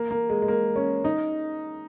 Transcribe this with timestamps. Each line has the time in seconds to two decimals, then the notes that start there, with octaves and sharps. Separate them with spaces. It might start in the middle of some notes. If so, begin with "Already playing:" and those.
Already playing: A#3
0.11 A#3
0.30 G#3
0.42 G#3
0.48 A#3
0.76 C#4
1.04 D#4